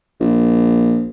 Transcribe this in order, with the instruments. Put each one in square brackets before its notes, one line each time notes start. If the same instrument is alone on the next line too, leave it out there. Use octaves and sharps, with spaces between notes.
[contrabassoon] A#1